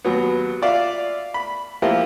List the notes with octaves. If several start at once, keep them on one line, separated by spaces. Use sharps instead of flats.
D#2 F#3 B3
F4 D5 E5 F5
B5
F3 A#3 E4 F4 G4